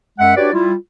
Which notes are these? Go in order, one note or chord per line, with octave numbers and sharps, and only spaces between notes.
F#2 G#3 E5 F#5
D4 F#4 G4 B4 C#5 D5
G3 E4 F4